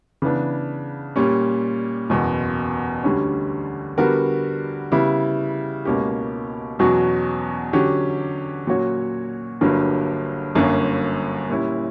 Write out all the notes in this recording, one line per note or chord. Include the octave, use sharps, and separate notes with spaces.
C#3 E3 B3 D4
A#2 G3 C#4
F#1 E2 B2
D2 D3 G3 C#4
D3 G3 B3 F#4 A#4
C#3 G3 B3 E4
C#2 B2 A#3 C#4 G4
E2 B2 F#3 C#4 F#4
D3 F#3 C#4 G4
A#2 F#3 C#4 F#4 C#5
G1 G2 D3 F#3 A#3
G1 F#2 D3 A#3 C#4
A#2 G3 C#4 E4